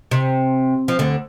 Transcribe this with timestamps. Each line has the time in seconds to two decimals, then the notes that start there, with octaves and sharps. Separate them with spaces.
0.11 C3
0.88 F3
0.99 D2 D3